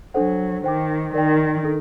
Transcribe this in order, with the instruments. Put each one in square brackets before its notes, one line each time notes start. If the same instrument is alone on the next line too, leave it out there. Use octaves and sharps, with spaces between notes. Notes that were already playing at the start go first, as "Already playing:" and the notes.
[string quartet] F#3 [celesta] D4 A4 C5 F#5
[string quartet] D#3 [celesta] C5 G5 D6
[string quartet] D#3 [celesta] A#4 D5 G5
[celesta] D4 A4